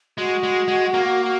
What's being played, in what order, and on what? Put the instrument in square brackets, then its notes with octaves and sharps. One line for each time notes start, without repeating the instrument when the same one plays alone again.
[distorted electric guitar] G#3 [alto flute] F#4
[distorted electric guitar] G#3
G#3
A#3